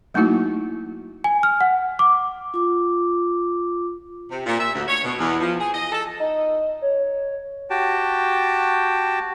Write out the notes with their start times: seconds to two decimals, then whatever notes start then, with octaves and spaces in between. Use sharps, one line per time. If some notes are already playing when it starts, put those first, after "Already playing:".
0.14 F#3 A3 A#3 D#4 E4 F#4
1.24 G#5
1.43 F6
1.61 F#5
1.99 D6
2.54 F4 D6
4.30 C3
4.46 A#2
4.60 E5
4.75 D2
4.88 C#5
5.05 B2
5.19 E2
5.40 F3
5.60 G#4
5.74 D#5
5.92 A4
6.20 D#4
6.82 C#5
7.70 F#4 G4 G5 A5